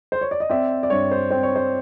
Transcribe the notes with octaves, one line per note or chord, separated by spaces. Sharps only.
C5
C#5
D5
D#5
C4 D5 E5
D5
G2 C#5
C5
C4 C5
C#5
C5